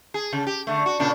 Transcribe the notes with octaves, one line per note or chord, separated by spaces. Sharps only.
G#4
C#3
G4
D3 A3
F#4
A#2 C#3 D4